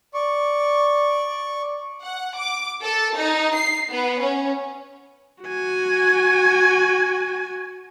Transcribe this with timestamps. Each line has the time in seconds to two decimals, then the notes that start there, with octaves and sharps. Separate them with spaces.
0.14 D5 C#6
2.02 F#5
2.37 D6
2.83 A4
3.17 D#4
3.55 C7
3.90 B3
4.20 C#4
5.44 F#4 G#5